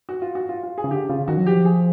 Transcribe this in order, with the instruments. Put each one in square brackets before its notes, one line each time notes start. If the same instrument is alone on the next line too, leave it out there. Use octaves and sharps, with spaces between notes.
[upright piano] F#4
F4
F#4
F4
F4
G#4
[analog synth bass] C#3
[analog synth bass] D3 [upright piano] G4
[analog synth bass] C#3 [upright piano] F4
[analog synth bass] D#3 [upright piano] F#4
[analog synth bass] F#3
[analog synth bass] F3 [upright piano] G4
[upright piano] G#4